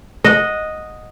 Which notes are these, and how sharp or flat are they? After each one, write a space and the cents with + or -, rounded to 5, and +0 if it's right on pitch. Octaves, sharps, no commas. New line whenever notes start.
D#5 +0 F#5 -15